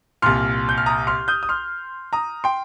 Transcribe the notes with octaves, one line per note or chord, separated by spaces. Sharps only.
C2 A#2 C6 F6
G6
F6
A#5 D#6
C6 F6
D#6 G6
D#6
C6 F6
A#5 D#6
G5 C6